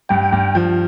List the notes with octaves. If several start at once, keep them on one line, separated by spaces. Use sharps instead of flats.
G2 G5
G2
F3